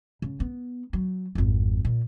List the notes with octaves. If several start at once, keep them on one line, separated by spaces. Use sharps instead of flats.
C#3
B3
F#3
G#1 F2
A#2